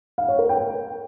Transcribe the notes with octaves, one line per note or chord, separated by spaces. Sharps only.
F5
C#5
A#4
G5